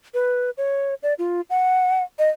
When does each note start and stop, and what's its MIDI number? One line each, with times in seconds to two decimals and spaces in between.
0.14 0.50 71
0.58 0.94 73
1.03 1.14 74
1.19 1.41 65
1.50 2.03 78
2.19 2.30 75